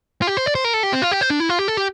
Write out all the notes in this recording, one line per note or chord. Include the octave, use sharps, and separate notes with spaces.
F4
G4
C5
D5
C5
A#4
A4
G4
C4
F4
G4
C5
D4
E4
F4
G4
A4
G4